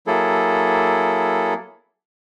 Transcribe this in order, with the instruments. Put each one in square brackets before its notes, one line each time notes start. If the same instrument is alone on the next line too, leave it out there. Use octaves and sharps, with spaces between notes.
[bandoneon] F#3 A#3 E4 G#4 A4